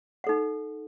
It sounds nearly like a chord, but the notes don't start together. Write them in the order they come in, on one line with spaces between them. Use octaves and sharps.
F#5 A4 D#4